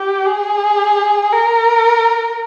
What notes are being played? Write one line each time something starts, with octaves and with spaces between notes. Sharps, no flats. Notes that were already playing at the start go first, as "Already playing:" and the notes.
Already playing: G4
G#4
A#4